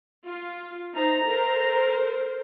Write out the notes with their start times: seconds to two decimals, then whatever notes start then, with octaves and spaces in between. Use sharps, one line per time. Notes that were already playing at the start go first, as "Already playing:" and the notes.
0.23 F4
0.94 D#4 C5 E5 A5 A#5
1.25 A4 A#4 C5